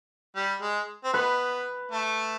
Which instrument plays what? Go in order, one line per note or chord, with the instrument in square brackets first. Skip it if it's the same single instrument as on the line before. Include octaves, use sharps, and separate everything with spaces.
[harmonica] G3
G#3
C4
[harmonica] B3 [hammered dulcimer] B4
[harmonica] A3